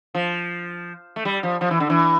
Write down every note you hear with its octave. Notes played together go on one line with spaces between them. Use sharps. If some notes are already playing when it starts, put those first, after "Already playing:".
F3
A3
G3
F3
F3
E3
D3
E3